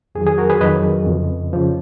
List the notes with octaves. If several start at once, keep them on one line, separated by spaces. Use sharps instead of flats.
F2 D#3 F#3 G#4
G#4
F#4 A#4
G#4 B4
F2 D#3 F#3 B4 D#5
F2 C#3 F3
C#3 F3